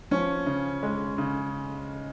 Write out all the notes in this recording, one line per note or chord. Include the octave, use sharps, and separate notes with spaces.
F3 C#4
C#3
G#3
C#3